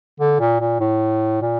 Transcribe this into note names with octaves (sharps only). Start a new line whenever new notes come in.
D3
A#2
A#2
A2
A#2